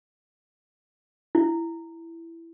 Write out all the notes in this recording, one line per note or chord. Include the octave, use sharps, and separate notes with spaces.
E4